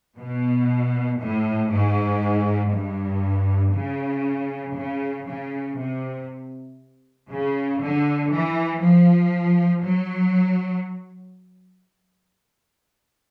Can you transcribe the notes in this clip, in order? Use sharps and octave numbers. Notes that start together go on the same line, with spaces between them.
B2
A2
G#2
G2
C#3
C#3
C#3
C3
C#3
D3
E3
F3
F#3